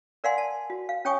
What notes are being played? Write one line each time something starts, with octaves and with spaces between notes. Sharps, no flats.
A#4 D5 F5 F#5 G#5 C6
A5
F#4
F5
C#4 C#5 G5 G#5 C#6 D#6